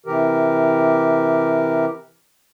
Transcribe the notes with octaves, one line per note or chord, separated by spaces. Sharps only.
C3 E3 G4 A#4